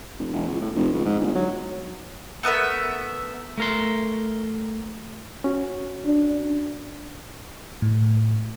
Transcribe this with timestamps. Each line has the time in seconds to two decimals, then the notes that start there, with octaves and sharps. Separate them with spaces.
0.19 F1
0.33 E1
0.48 C#2
0.61 A2
0.76 F1
0.93 C#2
1.06 G#2
1.20 G1
1.35 F#3
2.43 A3 B3 A#4 E5
3.58 A3 A#4 C6
5.44 C#4 F#4
6.05 D4
7.82 A2